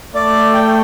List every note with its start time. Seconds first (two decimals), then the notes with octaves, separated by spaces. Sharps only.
0.15 A3 D5
0.54 G5